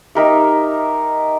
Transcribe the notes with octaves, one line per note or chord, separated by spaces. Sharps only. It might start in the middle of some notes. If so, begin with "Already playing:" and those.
D#4 G4 A#4 E5